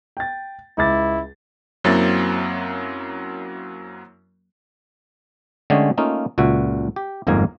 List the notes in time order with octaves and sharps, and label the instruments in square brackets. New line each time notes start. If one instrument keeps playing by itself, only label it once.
[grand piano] G5 A6
[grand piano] C#2 D6 A6 [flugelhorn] E4
[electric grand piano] F#2 F#3 A#3 C4 E4 A6
[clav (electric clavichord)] D3 G#3 A3 C#4 G4 G#4
A3 A#3 C#4 D#4 F4
C#2 A#2 F#4 E5
G4
G1 F2 G#2 A#3 A#4 G#5